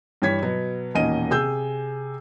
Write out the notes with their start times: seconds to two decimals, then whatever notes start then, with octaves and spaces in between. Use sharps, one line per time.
0.22 G2 E3 C#5 G#6 B6
0.42 B2 F#3 B3
0.95 E1 A#2 D#3 C#4 D#5 D#7
1.30 C3 G#4 E6 G6